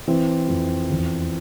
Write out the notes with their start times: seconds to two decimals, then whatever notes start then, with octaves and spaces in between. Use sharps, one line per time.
0.08 E3 C4
0.49 F2
0.90 E2